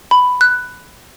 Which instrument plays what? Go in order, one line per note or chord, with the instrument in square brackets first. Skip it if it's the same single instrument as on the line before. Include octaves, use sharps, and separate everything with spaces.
[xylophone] B5
F#6